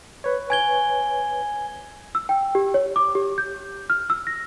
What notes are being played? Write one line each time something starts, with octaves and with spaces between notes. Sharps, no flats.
B4 C#5
G#5 G#6 G7
E6
G5
G4
C#5
D6
G4
G6
F6
E6
A#6